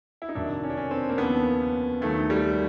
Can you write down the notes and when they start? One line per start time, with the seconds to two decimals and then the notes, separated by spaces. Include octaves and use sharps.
0.22 E4
0.29 D#4
0.35 F#1 F2 C3 D#3 F#3 D4
0.63 C#4
0.70 D4
0.77 C#4
0.91 C4
1.09 A#3
1.18 D#2 C#3 F3 B3
2.01 D#2 D#3 F#3 A3
2.30 G3